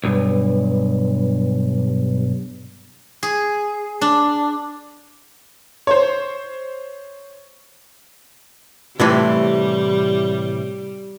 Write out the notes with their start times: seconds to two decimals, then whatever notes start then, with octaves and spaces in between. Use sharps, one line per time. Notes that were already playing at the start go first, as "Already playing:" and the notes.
0.04 B1 G2
3.23 G#4
4.01 D4
5.87 C5 C#5
9.00 A2 C3 E3 G3